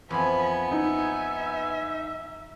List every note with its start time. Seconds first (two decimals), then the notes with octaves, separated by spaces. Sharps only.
0.10 F2 E3 F3 B3 G#5 B5
0.72 D#4 E5